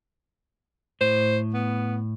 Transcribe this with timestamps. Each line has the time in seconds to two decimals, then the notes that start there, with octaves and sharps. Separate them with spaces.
1.01 A2 C5
1.54 B3